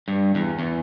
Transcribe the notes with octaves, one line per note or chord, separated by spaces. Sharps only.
G2
E2
E2